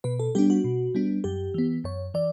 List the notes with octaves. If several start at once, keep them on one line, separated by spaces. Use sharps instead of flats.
B2 B4
A4
G3 B3 D4 G4
F#4
B2
G3 B3 D4
F#2 G4
E3 B3
F#2 C#5
E3 D5